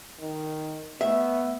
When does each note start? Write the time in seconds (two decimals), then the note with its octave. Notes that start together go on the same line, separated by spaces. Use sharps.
0.21 D#3
1.01 A3 B3 E5